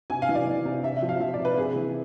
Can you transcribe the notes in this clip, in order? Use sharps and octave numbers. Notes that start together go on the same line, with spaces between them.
C3 G#5
F5
E3
D5
E3
C3
C3 E5
E5
F3
F5
F3 E5
C3 D5
B4
C3 G#4
E3